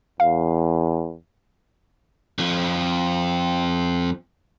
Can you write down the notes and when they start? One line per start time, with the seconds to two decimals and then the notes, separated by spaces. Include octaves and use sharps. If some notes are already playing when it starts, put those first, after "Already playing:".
0.20 E2 F5
2.38 F2 F3